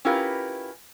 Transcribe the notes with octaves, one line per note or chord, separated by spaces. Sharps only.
C#4 E4 F4 G4 A#4 B4